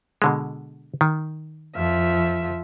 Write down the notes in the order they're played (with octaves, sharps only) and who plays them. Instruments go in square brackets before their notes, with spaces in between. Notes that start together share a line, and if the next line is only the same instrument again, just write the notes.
[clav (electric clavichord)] B2 D3 G#3
D#3
[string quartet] F2 F3 E5